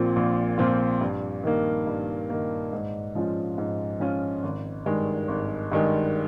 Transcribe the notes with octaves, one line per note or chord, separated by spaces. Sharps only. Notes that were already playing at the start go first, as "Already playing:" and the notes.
Already playing: A#1 A#2 F3 C4 F4
A#1
A#2 F3 C4 F4
G2
D#3 A#3
G2
D#3 A#3
G#2
F3 G#3 C#4 F4
G#2
F3 G#3 C#4 F4
G#1
G2 D#3 G#3
G#1
G2 D#3 G#3